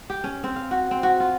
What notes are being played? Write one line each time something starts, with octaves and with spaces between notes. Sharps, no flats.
G4
C#4
C4
F5
F#4
C4
F#4
F4